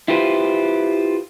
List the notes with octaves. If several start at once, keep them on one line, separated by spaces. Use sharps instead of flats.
E4 F4 G4 B4 C5